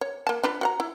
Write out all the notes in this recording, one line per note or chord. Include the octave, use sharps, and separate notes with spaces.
C#5
A#3 A5
D4 F4 B4
F#4 F#5 A#5
E4